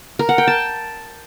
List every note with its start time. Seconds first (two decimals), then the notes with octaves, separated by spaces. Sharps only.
0.19 A#4
0.29 F#5
0.38 G5
0.47 A5